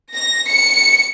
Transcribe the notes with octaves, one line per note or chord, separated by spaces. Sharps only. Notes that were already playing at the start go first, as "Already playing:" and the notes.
A#6
C#7